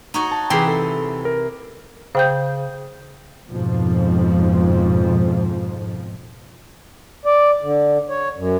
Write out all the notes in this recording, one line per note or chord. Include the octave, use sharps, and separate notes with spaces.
D#4 F#4 C#5
A5
C3 E3 G#4 G5 C6
A4
A#4
C#3 C5 G5 G6
F2 G#2 B2 F3
D5
D3
C#5
F#2